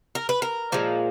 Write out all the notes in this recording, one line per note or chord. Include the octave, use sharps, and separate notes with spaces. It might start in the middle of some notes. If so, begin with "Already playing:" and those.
A#4
B4
A#4
A#2 F3 G#3